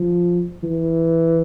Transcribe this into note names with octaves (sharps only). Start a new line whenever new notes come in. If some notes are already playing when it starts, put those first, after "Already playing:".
Already playing: F3
E3